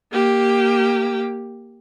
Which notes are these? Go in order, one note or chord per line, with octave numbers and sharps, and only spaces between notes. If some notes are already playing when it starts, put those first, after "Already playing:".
A#3 G4